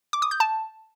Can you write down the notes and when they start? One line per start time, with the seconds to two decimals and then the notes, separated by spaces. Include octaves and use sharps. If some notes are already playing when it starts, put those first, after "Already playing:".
0.13 D6
0.22 D#6
0.31 G6
0.40 A5